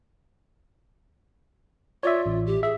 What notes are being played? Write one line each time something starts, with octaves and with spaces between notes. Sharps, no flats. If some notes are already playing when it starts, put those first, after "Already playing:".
F4 C#5 D5 E5
A1
G4
G#4 E5